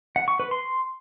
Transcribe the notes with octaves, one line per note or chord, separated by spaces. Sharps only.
F#5
C#6
B4
C6